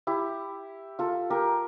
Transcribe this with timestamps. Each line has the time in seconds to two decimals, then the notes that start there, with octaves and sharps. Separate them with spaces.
0.07 E4 G4
0.99 F4 A4
1.30 G4 A#4